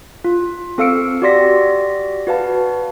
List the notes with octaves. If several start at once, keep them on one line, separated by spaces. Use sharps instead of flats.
F4
C4 A4 F5 E6 C#7 D7
F#4 G4 D5 C6 A#6 B6
F#4 B4 F5 A5